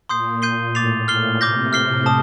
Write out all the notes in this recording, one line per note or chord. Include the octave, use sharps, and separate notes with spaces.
A#2 C6 D#6 G6 C7
G6 C7 D#7 G7
A2 D6 A6 C7 F7
A#2 F6 C7 G7
C3 D6 G6 A#6
A2 F6 C7 G7
A5 D#6